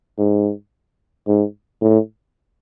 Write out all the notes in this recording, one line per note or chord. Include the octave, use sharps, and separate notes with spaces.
G#2
G#2
A2